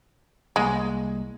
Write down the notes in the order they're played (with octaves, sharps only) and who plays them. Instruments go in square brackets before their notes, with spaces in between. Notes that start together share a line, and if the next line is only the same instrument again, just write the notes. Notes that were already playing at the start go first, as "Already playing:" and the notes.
[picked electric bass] C2 G3 A#3 [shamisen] G#3